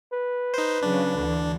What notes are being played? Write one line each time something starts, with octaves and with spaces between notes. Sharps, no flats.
B4
D#4 C5
C#3 F#3 D4
D2 D3 E3